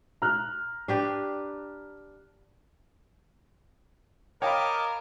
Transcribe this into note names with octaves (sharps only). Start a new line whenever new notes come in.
A#5 F6 F#6
D4 G4 B4
A#4 C#5 D#5 F5 G5 A5 B5 D6